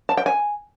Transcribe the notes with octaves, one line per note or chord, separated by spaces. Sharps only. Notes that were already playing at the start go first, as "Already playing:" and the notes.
A5
G5
G#5